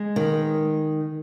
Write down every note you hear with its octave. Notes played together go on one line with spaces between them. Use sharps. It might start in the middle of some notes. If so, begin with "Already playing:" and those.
Already playing: G#3
D#3